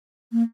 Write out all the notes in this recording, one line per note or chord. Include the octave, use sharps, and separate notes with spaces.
A#3